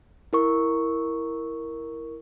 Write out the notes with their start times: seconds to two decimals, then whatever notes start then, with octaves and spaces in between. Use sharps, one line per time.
0.33 E4 A#4 C#6